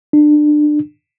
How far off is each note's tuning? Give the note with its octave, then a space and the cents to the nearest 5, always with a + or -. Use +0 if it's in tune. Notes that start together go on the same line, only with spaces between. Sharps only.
D4 +25